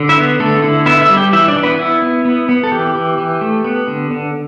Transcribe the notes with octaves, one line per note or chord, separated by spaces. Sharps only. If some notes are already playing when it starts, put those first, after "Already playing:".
Already playing: D3
E4 E5
B3
D3 A3 A4
D3 E4
B3 E4 E5
E4 E5
G3
G4 G5
E3 E4 E5
D4 D5
E3
B3 B4
B3 E4
B3
B3
B3
A4
E3 G4
E3
E3
A3
B3
D3
D3